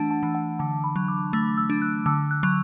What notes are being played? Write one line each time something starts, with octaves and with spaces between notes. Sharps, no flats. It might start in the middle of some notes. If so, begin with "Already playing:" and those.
Already playing: E3 A3 D4 F#5 A5
A5
E3
F#5
D3 A5
B5
F#3
D6
A3
E6
D4
F#6
D3 E6
F#6
F#3